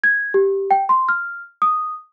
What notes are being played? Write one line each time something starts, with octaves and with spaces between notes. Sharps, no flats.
G#6
G4
G5
C6
F6
D#6